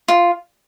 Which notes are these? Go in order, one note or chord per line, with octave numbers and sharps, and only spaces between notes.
F4